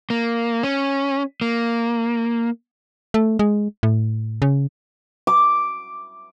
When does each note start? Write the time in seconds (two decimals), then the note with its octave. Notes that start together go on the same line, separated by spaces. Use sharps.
0.10 A#3
0.63 C#4
1.41 A#3
3.14 A3
3.39 G#3
3.83 A2
4.42 C#3
5.27 D6